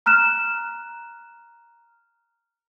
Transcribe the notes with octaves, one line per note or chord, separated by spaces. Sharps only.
A#5 F6 F#6 E7